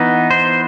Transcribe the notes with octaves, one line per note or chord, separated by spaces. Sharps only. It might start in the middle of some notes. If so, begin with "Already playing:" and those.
Already playing: E3 B3 D#4
C5